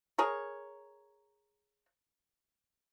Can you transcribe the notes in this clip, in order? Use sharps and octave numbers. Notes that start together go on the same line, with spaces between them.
G#4 A#4 C#5